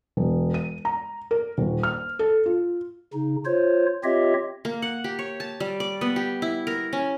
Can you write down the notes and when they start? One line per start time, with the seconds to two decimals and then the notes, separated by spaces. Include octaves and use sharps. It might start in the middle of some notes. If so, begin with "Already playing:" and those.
0.17 E1
0.54 D#7
0.85 A#5
1.31 A#4
1.58 D#1
1.83 F6
2.19 A4
2.46 F4
3.14 C#3 D#4
3.45 F4 C5 C#5
4.04 C4 F4 G4 C#5 D#5 E5
4.65 A#3
4.82 F#5
5.04 G4
5.19 C#5
5.40 A5
5.60 G3
5.80 D5
6.01 B3
6.16 G4
6.42 E4
6.67 A#4
6.93 C#4